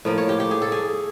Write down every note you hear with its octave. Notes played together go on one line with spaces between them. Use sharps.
A2 F3 A#3
C#5
G4
G4
G#4
A4
G#4